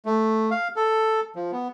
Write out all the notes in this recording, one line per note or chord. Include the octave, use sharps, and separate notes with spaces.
A3
F5
A4
F3
B3